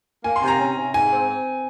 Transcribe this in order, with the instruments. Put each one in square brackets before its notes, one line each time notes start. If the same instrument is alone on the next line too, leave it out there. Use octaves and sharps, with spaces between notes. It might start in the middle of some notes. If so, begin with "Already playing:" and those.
[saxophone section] A#3 [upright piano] G#5
[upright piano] C6
[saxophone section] C3
[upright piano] A#5
[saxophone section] C#4
C3
[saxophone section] G#2 [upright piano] G#5
[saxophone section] C4
C4